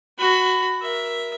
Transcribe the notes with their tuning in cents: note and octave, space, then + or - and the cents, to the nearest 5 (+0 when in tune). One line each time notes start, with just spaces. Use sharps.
F#4 +0 B5 +20
A#4 +20 E5 +0